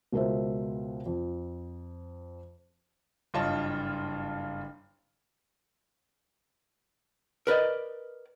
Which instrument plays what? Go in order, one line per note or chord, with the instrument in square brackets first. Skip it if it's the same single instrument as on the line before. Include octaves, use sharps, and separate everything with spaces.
[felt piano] C#2 B2 A#4 C5 E5
F2
[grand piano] F#1 G2 F4 C#5 D#5 A5
[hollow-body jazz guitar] A#4 B4 D5 D#5